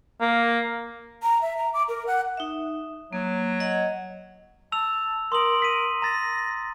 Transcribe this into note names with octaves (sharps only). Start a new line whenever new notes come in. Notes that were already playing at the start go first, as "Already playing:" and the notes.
A#3
A#5
E5
A#5
D6
A#4
F#5
D#4 E5
F#3 A#3
D#5 F#5
A5 E6 F7
A#4 C6 D#6 F#7
B6 D#7
A#5 A6 A#6